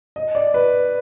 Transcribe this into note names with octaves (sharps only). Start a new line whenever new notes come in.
D#5
D5
B4